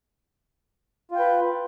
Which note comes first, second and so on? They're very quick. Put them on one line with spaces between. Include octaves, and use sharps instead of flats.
F4 G5 B4